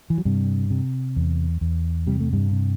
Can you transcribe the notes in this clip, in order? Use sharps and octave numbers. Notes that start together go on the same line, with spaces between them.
E3
F#3
G2 C3 G3
C3
E2
E2
C3 G3
A3
G2 G3
C3